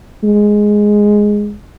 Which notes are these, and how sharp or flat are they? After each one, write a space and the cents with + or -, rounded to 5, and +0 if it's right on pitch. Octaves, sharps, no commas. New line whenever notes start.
G#3 +0